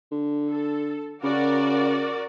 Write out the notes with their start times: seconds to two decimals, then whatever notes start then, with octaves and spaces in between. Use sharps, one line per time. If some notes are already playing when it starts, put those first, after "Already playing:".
0.11 D3
0.50 A4
1.23 C#3 F#4 A#4 D5